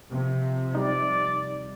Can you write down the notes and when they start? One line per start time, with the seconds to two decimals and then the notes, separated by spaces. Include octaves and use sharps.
0.10 C3 F3
0.75 G3 D#4 D5